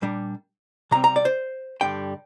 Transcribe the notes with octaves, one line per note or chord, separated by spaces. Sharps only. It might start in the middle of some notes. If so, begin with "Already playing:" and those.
A#2 G3 D4
C3 G3 C4 A#5
A#5
D5
C5
G2 D3 G3 G5